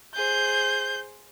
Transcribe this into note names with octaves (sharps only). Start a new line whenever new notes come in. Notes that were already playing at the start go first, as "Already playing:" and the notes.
G#4 C5 G6